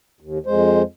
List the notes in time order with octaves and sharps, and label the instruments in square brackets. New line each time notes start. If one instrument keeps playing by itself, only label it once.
[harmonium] D#2
F2 G#3 C5